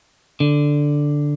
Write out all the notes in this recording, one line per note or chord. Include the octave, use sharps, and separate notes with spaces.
D3